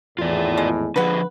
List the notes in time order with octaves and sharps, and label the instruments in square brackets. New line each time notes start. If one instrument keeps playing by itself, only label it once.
[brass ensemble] G#1 E2 A2 [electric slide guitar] F4 D5
[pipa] G#3
[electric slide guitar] D3 F3 G#4 [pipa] B3 B4